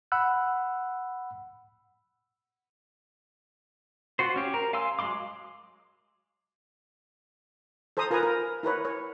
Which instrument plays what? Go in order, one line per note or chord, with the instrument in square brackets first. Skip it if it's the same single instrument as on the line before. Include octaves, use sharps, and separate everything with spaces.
[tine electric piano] F#5 B5 E6 F#6
[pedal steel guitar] F4 F#4 C5
C#4 G4
A#4
F5 G#5 C6 E6
F#3 G#3 F5 C6 D6
[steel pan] A4 C5 A5 A#5 D#6
F4 A#4 B4 G#5 A#5 D#6
A#4
E4 A#4 B4 C#5
C#5